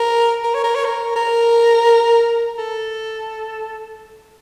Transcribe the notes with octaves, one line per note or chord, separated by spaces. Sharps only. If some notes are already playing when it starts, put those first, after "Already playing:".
Already playing: A#4
A#4
C#5
A#4
C#5
A#4
A#4
A4